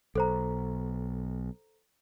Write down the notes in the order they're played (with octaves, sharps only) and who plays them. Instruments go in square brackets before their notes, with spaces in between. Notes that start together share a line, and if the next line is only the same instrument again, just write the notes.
[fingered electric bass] B1 [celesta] A4 C5 A#5